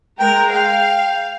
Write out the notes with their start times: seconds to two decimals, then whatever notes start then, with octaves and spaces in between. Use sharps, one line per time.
0.20 G#3 A#4 G5
0.52 F5 G5